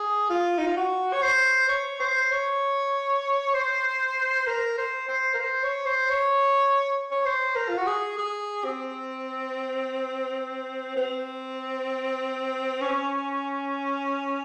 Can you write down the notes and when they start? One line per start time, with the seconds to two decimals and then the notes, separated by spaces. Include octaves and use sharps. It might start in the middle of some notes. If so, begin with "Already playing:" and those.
Already playing: G#4
0.30 F4
0.58 D#4
0.66 F4
0.77 F#4
1.13 C#5
1.22 C5
1.69 C#5
2.00 C5
2.31 C#5
3.54 C5
4.47 A#4
4.78 C5
5.08 C5
5.34 A#4
5.40 C5
5.63 C#5
5.86 C5
6.09 C#5
7.11 C#5
7.25 C5
7.56 A#4
7.69 F4
7.77 F#4
7.87 G#4
8.18 G#4
8.64 C4
10.97 C4
12.82 C#4